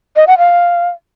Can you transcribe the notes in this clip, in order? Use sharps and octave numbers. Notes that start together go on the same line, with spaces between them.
D#5
F#5
F5